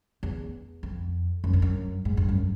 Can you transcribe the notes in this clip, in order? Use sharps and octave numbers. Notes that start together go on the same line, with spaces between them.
E2
F2
F#2
G2
F#2
G#2
G2
F#2